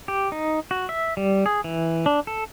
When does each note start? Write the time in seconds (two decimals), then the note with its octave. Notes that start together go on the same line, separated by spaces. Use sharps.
0.08 G4
0.32 D#4
0.71 F#4
0.89 E5
1.17 G3
1.46 G#4
1.64 E3
2.06 D4
2.27 A4